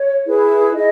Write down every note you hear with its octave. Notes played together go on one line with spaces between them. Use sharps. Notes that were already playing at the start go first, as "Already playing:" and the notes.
Already playing: C#5
E4 G#4 B4
E4 G#4 D#5